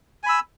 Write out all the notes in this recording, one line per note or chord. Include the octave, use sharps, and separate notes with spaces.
G#5 B5 E6